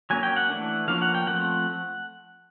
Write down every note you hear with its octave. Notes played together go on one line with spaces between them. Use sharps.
F#3 A#3 C#4 G#5
G5
F#5
E3 A3 D4
F3 A#3 C#4 F5
F#5
G5
F3 A3 C4 F#5